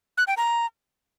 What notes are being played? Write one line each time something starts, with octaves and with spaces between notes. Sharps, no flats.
F#6
G5
A#5